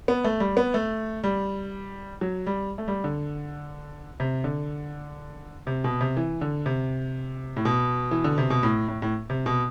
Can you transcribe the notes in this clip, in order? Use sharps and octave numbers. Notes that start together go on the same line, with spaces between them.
B3
A3
G3
B3
A3
G3
F#3
G3
A3
G3
D3
C3
D3
C3
B2
C3
E3
D3
C3
A2
B2
E3
D3
C3
B2
A2
A2
A2
C3
B2